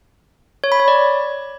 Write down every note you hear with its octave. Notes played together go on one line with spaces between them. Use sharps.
C#5
B5
C#5
D5